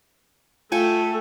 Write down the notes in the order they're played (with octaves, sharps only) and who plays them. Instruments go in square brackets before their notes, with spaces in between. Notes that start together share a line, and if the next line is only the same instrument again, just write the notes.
[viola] A3 [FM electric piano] F4 [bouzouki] A4 G5 [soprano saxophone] G#5